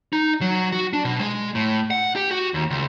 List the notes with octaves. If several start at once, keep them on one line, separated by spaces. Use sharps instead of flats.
D#4
F#3
F#4
D4
B2
G#3
A2
F#5
G4
F#4
D#2
C#2